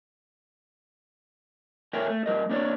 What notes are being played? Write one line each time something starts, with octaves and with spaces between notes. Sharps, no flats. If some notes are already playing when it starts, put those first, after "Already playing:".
A4 A#4 C#5 E5 G5 G#5
A3
G3 A#4 D#5
A#3 D4 C#5 D5